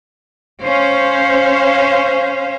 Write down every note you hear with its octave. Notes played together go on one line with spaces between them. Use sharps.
C#4 C5 F5